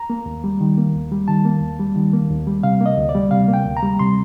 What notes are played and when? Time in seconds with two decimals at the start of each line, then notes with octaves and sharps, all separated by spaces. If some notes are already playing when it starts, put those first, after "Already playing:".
Already playing: A#5
0.10 A#3
0.26 D#2
0.44 G3
0.61 D#3
0.78 A#3
0.95 D#2
1.12 G3
1.28 D#3 A5
1.45 A#3
1.61 D#2
1.79 G3
1.96 D#3
2.13 A#3
2.30 D#2
2.47 G3
2.63 C3 F5
2.81 A#3 D#5
2.97 D2
3.09 D5
3.15 G3
3.31 C3 F5
3.48 A#3
3.54 G5
3.66 D2
3.77 A#5
3.83 G3
3.99 C3 C6